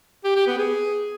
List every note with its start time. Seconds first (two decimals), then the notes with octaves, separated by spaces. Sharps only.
0.24 G4
0.35 G4
0.47 B3
0.58 G#4